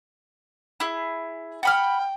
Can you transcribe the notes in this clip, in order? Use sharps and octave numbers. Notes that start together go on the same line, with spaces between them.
E4 G#4
F#5 G5 B5 F6